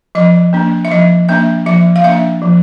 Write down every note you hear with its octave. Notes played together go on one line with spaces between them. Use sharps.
F3 D#5
A#3 D4
E5
F3 D#5
A#3 D4 E5
F3 E5
F5
A#3 D4 E5
F3